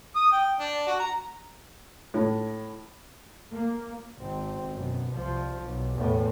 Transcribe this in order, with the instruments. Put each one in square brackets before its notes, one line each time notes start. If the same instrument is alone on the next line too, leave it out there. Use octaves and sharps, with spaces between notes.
[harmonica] D#6
G5
D4
F#4
A#5
[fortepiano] A2
[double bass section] A#3
[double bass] G#1 C4
F#2 B2
C2 F3
B1
E2 A2